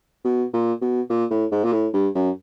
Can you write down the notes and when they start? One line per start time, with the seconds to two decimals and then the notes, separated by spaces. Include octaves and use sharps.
0.25 B2
0.53 A#2
0.81 B2
1.10 A#2
1.30 A2
1.52 G#2
1.64 A#2
1.73 A2
1.93 G2
2.15 F#2